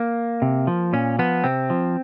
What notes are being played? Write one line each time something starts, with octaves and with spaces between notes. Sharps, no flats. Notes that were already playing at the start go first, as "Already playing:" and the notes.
Already playing: A#3
C3
F3
A#2 C#4
F3 B3
C3 C4
F3